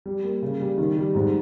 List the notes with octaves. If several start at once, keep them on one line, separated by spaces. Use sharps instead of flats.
G3
A#3
C#3
G3
D#3
G3
G#2